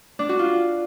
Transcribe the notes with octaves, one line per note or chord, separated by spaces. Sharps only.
D4
F#4
F4